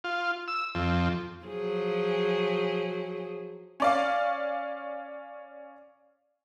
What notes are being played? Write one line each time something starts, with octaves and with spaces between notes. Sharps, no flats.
F4
E6
F2
F3 F#3 G#4
C#4 D5 F5